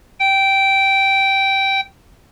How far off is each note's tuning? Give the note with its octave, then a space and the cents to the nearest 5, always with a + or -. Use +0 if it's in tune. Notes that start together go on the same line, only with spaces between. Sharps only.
G5 -10